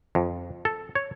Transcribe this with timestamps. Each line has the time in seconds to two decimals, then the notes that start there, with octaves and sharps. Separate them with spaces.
0.15 F2
0.65 A4
0.95 C#5